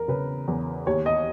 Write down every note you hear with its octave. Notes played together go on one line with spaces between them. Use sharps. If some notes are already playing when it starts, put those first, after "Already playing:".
Already playing: E2 A#4
C#3 B4
E2
D#2 C#5
D#5